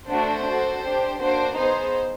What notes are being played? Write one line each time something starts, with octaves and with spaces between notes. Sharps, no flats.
A3 D4 F#4 A4 C5
D4 F#4 A4
D4 G4
A#3 D4 F#4 C5
B3 D#4 G#4 C5